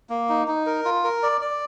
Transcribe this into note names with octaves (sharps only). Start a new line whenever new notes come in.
A#3
D#4
D#4
A#4
F4
A#4
D5
D5